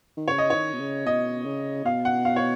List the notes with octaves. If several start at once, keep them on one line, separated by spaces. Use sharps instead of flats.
D#3
C#3 C#5
D#5
D#3 C#5
B2
C#3
B2 D#5
C#3
B2 F5
F#5
F5
C#5